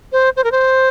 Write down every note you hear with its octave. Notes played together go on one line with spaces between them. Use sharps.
C5
C5
A#4
C5